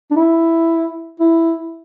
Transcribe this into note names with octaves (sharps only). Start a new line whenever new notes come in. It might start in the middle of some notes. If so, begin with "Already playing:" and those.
D4
E4
E4